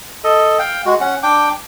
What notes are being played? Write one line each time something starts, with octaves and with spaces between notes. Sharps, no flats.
A4 D#5
F5 G5
G#3 F#4
C#4 F#5
D4 G5 D6